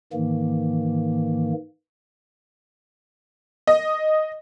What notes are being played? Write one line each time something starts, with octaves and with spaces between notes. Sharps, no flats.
G#2 D#3 E3 A#3
D#5